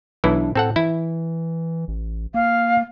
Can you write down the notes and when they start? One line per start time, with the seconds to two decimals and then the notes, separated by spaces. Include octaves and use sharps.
0.24 B1 E3 D4 E4
0.55 A2 C4 A4 F#5
0.76 E3 E4
1.88 A1
2.34 A#3 F5